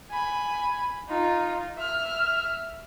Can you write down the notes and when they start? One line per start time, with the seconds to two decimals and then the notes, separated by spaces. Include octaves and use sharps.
0.11 G#5 B5
1.09 D#4 F4
1.77 E5 F6